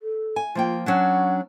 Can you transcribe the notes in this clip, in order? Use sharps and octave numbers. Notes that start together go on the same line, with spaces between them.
A4
G#5
F3 A#3 F4 G5
F#3 C#4 D4 F#5